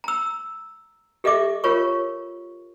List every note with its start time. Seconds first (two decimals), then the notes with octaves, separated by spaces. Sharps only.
0.04 A#5 E6
1.24 G4 A4 D#5 E5 D6
1.64 F4 A#4 C#5 C#6